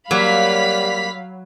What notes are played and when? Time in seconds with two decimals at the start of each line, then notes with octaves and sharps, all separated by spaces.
0.11 F#3 G3 A#3 F5 B5 B6